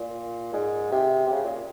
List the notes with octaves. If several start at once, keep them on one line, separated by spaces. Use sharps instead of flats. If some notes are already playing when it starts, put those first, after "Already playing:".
Already playing: A#2
G#2
C3
C3
C#3
A#2